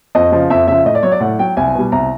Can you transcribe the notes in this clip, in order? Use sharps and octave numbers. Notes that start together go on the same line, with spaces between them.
F2 D#5
C#3 F3
F2 E5
C#3 F3 E5
A2 D#5
D5
F#3 C#5
D5
A2 F#5
F#3 G5
C2 G#5
B2 G3
C2 A#5